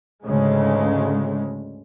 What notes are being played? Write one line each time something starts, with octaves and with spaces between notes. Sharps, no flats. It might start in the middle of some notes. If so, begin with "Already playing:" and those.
D2 G#2 C#3 G#3